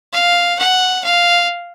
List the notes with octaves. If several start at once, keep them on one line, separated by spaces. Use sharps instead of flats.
F5
F#5
F5